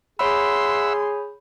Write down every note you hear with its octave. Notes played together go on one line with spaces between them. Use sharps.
G#4 C#5 E5 F#5 B5 C6 E6